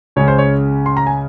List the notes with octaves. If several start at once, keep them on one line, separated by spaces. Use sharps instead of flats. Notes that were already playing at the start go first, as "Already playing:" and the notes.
C#2 C#3 G#3 C#4 C#5
C5
C#5
C6
A#5
G#5